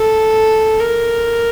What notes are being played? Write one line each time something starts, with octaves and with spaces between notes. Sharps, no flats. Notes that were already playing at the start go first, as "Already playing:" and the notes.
Already playing: A4
A#4